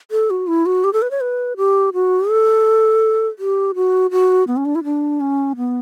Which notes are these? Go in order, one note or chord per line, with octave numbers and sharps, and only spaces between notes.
A4
F#4
E4
F#4
G4
A4
B4
C#5
B4
G4
F#4
A4
G4
F#4
F#4
B3
C#4
D4
E4
D4
C#4
B3